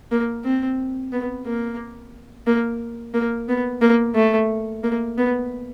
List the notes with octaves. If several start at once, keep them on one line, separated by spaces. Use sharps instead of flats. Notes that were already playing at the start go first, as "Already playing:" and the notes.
A#3
C4
B3
A#3
A#3
A#3
B3
A#3
A3
A#3
B3